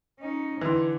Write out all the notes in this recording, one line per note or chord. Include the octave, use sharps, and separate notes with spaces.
C#4 D#4
D3 E3 C6